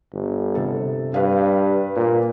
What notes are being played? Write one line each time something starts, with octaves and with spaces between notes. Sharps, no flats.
G1
C3 A4
G2 B4 F5
A#2